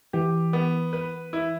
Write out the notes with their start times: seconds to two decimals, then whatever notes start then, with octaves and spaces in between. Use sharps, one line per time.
0.13 E3 G4
0.53 B3
0.93 B4
1.33 E4